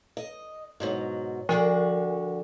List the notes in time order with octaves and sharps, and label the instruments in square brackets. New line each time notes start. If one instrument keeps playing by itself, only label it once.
[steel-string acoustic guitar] D#5
G#2 B2 F#3
[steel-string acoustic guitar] D3 F#4 G5 [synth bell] F3